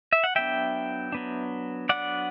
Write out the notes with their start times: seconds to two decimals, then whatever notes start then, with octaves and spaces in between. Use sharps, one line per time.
0.13 E5
0.24 F#5
0.35 F#3 B3 D4 E5 G5
1.12 F#3 B3 D4
1.89 F#3 B3 D4 D5 F#5